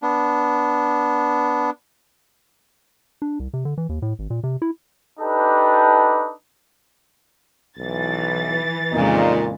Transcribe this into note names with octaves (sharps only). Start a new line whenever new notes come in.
B3 D4
D4
C2
C3
D3
E3
D#2
A2
G#1
A#2
C3
E4
D4 D#4 G4 A4 B4
B1 E3 A6
F2 A#2 C#3 G#3 D#4